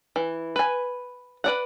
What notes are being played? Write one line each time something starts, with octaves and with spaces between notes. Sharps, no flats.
E3
B4 G#5
B4 D5 F#5